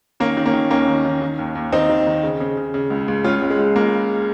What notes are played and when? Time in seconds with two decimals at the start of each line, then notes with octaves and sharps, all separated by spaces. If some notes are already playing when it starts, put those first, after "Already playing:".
0.20 D#3 A#3 C#4
0.37 D#3
0.46 A#3 C#4
0.54 D#3
0.70 D#2 A#3 C#4
0.88 D#3
1.05 D#3
1.22 D#3
1.39 D#2
1.55 D#2
1.72 D#3 C4 D#4
1.90 D#3
2.07 D#3
2.23 C#3
2.40 C#3
2.57 C#3
2.74 C#3
2.90 C#2
3.08 C#2
3.24 C#2 C#4 F4
3.41 C#2
3.50 G#3
3.59 C#2
3.76 C#2 A#3